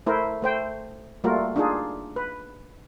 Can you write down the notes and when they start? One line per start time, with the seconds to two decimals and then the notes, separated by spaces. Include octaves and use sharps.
0.06 A3 E4 A#4 C5
0.42 A3 C5 G5
1.24 G3 A3 A#3 F4 F#4 A#4
1.56 D4 D#4 F4 G#4
2.16 B4